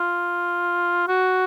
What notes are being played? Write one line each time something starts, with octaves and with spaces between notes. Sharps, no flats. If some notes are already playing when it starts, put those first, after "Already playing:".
Already playing: F4
F#4